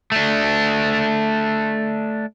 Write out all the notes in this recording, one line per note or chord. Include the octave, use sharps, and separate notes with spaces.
A3 D4